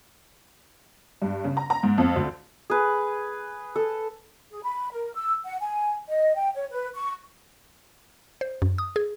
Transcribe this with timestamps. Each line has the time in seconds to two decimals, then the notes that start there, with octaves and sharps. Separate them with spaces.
1.22 G2
1.44 C#3
1.57 A#5
1.70 A#5
1.83 G#2
1.98 F2
2.16 D2
2.70 G#4 B4
3.76 A4
4.51 G#4
4.64 B5
4.92 A#4
5.14 E6
5.45 F#5
5.61 G#5
6.09 D#5
6.36 G5
6.55 C#5
6.71 B4
6.95 C#6
8.41 C5
8.62 F#2
8.78 D#6
8.96 G#4